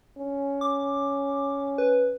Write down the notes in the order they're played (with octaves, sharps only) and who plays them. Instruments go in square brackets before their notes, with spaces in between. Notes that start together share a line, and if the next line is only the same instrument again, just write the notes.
[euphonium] C#4
[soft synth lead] D6
B4